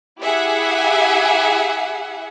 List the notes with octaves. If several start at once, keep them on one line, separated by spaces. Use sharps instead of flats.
E4 G4 G#4 E5 F#5 G#5